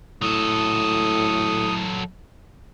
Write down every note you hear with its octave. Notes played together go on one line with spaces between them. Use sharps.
A2 F#3 A4 D#6